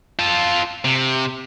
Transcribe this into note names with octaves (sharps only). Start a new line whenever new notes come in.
F4 A4
C3